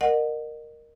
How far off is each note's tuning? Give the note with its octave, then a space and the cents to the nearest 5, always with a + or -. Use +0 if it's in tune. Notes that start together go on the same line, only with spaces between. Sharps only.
A#4 +0 D#5 -35 F#5 -15